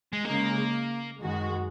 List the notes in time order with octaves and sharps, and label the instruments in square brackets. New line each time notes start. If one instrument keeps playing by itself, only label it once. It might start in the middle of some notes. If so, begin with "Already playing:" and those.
[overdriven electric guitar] G#3
[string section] C#3 G#3 D#4 [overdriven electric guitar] A#3
[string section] F#2 D#3 G#3 F#4